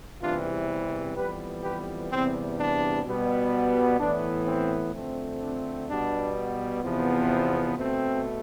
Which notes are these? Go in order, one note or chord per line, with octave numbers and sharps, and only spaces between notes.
E2 C3 E3 G3 C4 D4 F4
F2 E3 G3 B3 G4 B4
G4 B4
E2 C3 G3 B3 C4
D4
B2 G3 B3
A2 E3 B3 D4
C4
F2 D3 A3 C4
D4
B2 G3 B3 D4
E2 C3 F3 B3
C4
B2 A3 C4